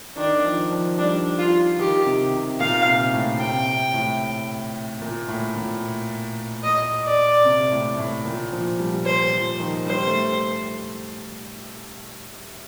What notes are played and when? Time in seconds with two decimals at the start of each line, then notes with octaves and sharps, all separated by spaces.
0.17 D#3 D4
0.44 F3
0.71 F3
0.98 G3 D4
1.38 F4
1.79 D#3 G4
2.06 C3
2.33 C3
2.60 A#2 F5
2.87 C3
3.13 A2
3.40 C3 G5
3.94 A2
5.02 A#2
5.28 A2
5.56 A#2
6.64 D#5
7.04 D5
7.45 C3
7.71 A2
7.98 A2
8.25 A#2
8.52 F3
8.79 G3
9.05 C5
9.33 F3
9.60 D#3
9.86 G3 C5
10.07 A3